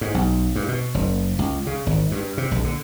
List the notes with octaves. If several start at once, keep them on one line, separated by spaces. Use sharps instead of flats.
G#2
B1
G2
B2
F#1
C#2
C#3
G#1
G2
C3
A#1
D3